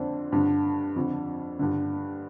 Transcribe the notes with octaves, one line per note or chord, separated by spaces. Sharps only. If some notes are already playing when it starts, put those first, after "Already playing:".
Already playing: F2 D3 C4 D4
G2 D3
F2 D3
G2 D3